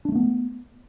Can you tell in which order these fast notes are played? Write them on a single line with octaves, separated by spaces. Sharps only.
D4 G#3 A3 B3